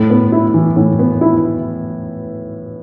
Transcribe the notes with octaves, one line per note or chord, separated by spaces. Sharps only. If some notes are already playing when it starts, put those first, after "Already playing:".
Already playing: A2
B3
E4
E3
A2
B3
E4